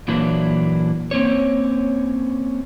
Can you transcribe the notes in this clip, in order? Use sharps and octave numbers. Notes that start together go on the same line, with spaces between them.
A#2 E3 F#3 A#3 D4 E4
A#3 C4 C#4 C#5